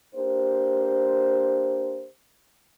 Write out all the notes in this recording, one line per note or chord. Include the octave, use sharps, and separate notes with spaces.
A#3 D4 G4 C5